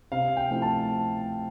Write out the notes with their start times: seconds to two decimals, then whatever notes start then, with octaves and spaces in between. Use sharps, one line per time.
0.12 C3 F5
0.37 G5
0.50 F3 A3 C4 E4
0.62 A5